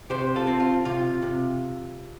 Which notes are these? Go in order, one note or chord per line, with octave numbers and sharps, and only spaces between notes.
C3 G4 C5
F4 A4
C4
F4
C3 F4
C3